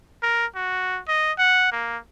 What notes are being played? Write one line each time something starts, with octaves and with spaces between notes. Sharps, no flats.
A#4
F#4
D#5
F#5
A#3